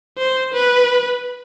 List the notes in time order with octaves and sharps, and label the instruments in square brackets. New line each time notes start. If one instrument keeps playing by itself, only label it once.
[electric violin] C5
B4